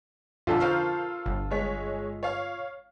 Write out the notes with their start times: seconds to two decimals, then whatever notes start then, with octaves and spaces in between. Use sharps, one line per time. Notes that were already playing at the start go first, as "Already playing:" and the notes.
0.47 B1 F2 D3 F4 A4 A5
0.60 A#4 C5 F5 C#6 F6 G6
1.26 G1
1.51 G#3 C#5 B6
2.23 C#5 F5